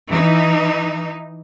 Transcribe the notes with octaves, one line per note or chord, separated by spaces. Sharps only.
E3 D#4